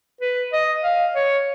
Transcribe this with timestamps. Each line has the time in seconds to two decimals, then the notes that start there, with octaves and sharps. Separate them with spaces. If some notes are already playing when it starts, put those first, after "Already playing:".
0.21 B4
0.53 D#5
0.84 F5
1.15 C#5